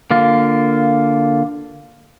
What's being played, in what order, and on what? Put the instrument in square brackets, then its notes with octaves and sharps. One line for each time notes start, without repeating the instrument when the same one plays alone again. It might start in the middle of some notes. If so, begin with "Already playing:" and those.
[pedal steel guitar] D3 A#3 F4